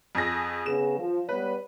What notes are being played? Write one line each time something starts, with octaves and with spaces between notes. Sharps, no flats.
F2 G#4 A#6
C#3 B3 G#4 E7
F3
G3 B3 B4 C#5